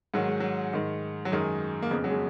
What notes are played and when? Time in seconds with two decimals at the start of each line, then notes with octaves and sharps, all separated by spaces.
0.14 G#2 D#3 F#3
0.28 G#3
0.40 F#3
0.74 G#2 D#3
1.25 F#3
1.32 F#2 D#3 G#3
1.82 A#3
1.90 F2 C#3 B3
2.04 F#3
2.10 G#3